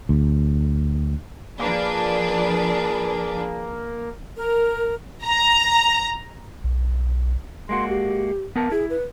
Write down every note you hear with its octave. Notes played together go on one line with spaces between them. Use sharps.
D2
F3 A#3 D4 G#4 B4
A#4
A#5
B1
G#3 A#3 F#4 C6
G4
B3 A#4 A5
E4 G#4
B4